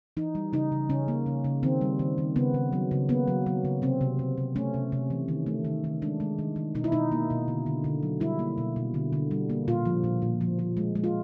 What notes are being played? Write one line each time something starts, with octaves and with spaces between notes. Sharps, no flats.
E3 D#4
G3
C#3 D#4
C#3
C#3 C#4
A#3
C#3
C#3
D#3 C4
G3
D#3
D#3
C#3 B3
C#3
F#3
C#3
A#3 B3
F#3
F#3
C#3
C3 C4
C3
C3
C3
A3 C#4
C3
C3
E3
D#3
A3
D#3
D#3
G#3 D4
G#3
D#3
D#3
B2 D#4
E4
B2 D#4
A#3
B2
D3
D3
D3
F#3
G3 E4
A#3
B2
B2
D3
D3
G3
A#3
A#2 F4
F3
A#2
A#2
F3
F3
G#3
G#3
F4